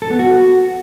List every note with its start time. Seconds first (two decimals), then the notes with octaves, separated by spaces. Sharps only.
0.02 A4
0.11 B3
0.19 F#4